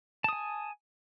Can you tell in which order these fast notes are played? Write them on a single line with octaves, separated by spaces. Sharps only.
A5 D#6 G#5